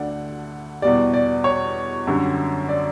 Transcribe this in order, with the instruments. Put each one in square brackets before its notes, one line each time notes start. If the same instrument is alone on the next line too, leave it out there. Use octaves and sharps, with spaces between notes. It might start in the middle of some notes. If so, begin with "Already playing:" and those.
Already playing: [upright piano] D2 D3 A3 D5 F#5
E2 B2 G3 D5
D5
C#5
F#2 D3 G3
D5